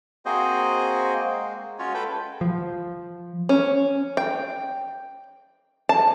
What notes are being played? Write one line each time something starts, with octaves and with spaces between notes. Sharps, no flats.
A#3 C4 F#4 G#4 C5 D#5
G#3 A#3
G#3 C#4 F4 F#4 C#5
A4 B4 G5
F3
C#4
G5
A5